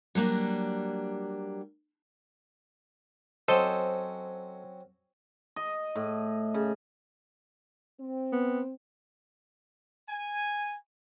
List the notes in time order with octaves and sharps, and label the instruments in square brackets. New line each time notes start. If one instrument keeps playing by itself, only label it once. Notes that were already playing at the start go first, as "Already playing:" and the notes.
[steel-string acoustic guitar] F#3 G3 A#3 D4
[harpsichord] F#3 C4 C#4 [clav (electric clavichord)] A4 C5 D#5
[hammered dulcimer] D#5
A2
C#3
[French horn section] C4
[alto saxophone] B3
[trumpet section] G#5